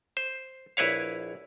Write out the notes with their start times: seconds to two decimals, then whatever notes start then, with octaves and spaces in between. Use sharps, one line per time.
0.17 C5
0.77 A#1 E4 B4 C#5 F5